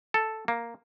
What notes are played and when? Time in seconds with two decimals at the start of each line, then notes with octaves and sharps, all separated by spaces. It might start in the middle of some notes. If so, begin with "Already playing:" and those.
0.14 A4
0.48 A#3